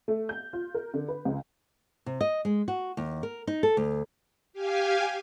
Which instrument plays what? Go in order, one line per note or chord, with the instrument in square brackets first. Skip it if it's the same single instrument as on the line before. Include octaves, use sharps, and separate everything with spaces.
[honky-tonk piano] A3
G6
F4
A#4
D3
B4
C#2
[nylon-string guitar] C3
D#5
G#3
F#4
D#2
A#4
D#4
A4
D2
[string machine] G4 F5 G#5